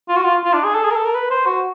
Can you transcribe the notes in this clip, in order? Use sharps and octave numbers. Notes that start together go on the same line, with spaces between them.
F4
F#4
F4
F4
D4
G#4
A4
G#4
A#4
A4
A#4
B4
C5
F#4